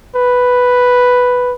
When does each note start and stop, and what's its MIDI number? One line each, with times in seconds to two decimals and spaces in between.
0.16 1.55 71